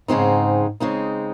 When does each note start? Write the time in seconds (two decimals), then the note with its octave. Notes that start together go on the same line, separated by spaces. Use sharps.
0.08 G#2 C#3 G#3 C4 D#4
0.80 C#3 G#3 C4 D#4